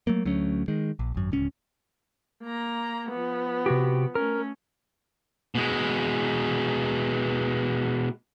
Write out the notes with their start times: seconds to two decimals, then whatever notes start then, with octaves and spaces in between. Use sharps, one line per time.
0.07 F#3 A3 A#3
0.25 D2 F#3 A3 C#4
0.68 D#3 G#3
0.99 A#1
1.14 G#1 F#2
1.32 D1 C#2 C#4
2.43 A#3 A#5
3.09 F3 B3
3.66 C3 F#4 G4
4.15 A3 C#4 A#4
5.55 B2 G#3